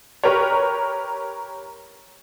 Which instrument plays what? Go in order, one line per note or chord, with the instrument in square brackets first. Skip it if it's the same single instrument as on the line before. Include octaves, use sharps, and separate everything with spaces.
[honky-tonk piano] G4 A#4 B4 C#5